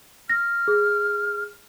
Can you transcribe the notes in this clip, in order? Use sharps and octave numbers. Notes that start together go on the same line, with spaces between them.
F6 A#6
G#4